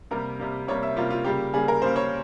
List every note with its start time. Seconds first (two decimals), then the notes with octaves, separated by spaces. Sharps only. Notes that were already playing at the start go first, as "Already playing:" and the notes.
0.11 C3 G3 A#3 A#4
0.39 C3 G3 A#3
0.68 C3 G3 A#3 C#5
0.83 E5
0.96 C3 G3 A#3 F4
1.10 F4
1.24 C#3 G3 A#3 G4
1.53 C#3 G3 A#3 G#4
1.68 A#4
1.82 C#3 G3 A#3 C5
1.96 C#5